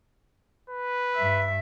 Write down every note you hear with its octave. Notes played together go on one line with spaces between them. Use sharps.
B4
G2 E5